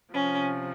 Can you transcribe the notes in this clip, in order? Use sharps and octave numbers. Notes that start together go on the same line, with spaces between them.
C3 F3 C#4